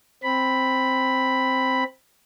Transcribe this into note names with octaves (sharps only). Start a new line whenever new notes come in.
C4 B5